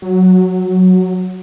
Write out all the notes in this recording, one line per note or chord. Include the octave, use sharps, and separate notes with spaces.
F#3